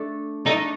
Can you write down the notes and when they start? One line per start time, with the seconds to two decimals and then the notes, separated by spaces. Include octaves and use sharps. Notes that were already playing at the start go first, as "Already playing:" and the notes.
Already playing: A3 D4 A4
0.45 A3 D4 D#4 A4 D5